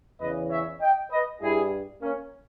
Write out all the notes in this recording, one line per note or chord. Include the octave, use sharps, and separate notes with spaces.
E2 C#3 E3 B4 D#5
C#5 E5
D#5 G5
B4 D#5
G2 G3 E4 G#4
A#3 C#4